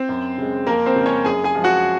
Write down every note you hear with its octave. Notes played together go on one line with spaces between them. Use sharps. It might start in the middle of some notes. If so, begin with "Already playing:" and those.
Already playing: C4 C5
F#2
C#3 G#3
F2 A#3 A#4
C4 C5
C#3 G#3
C#4 C#5
F#2 G#4 G#5
G#4 G#5
F3 G#3
F#4 F#5